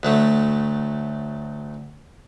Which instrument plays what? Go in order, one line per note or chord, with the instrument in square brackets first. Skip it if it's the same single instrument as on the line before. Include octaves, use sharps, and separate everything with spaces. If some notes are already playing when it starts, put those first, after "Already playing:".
[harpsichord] D2 F#3 A3